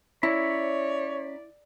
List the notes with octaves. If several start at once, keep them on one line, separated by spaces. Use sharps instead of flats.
C#4 E4 C#5 D5 A#5 B5